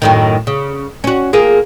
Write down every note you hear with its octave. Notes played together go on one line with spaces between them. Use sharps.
F#2 A2 D#3
C#3
C#4 F#4
A#3 F4 G#4